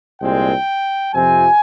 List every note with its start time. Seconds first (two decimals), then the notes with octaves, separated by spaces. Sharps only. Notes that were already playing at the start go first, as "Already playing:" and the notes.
0.21 C2 A#2 G#3 C4 G5
1.15 F2 C3 F3 C4 G#5